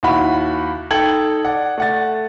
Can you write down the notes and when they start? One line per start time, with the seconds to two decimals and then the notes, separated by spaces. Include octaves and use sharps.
0.03 D#2 E4 F#4 B5
0.91 D#4 A4 G5 G#6 F#7
1.45 D5 F#5
1.78 A3 F#5 A6